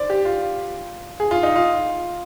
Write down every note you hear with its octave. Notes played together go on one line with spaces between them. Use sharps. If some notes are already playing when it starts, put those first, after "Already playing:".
Already playing: C5 D5
G4
F4
G#4
F4
D#4
F4